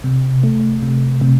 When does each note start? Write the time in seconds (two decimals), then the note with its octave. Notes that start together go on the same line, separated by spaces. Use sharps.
0.04 C3
0.43 A3
0.83 C3
1.21 C3